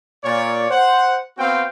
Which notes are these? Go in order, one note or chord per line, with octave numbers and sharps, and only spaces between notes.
A#2 C#5 D5
C5 F#5
B3 C4 F#4 F5 G5